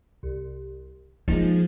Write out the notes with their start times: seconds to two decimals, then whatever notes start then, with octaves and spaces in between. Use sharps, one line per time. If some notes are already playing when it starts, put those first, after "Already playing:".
0.23 C2
1.28 F3 G#3 A#3 D#4